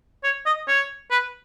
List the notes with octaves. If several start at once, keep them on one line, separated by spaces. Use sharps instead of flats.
C#5
D#5
C#5
B4